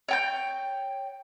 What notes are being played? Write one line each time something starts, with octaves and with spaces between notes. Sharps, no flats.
C#5 G5 G6